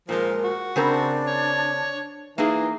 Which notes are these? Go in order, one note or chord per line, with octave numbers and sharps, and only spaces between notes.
A#2 F3 G#3 A#4
F#4
C#3 C4 D4 A#4
C#5
E3 A#3 D#4 G#4